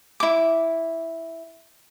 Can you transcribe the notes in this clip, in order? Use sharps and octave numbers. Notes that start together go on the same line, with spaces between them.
E4 D6